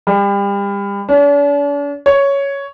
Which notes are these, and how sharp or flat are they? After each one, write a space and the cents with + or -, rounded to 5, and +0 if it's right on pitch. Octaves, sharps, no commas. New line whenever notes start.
G3 +35
D4 -45
C#5 +5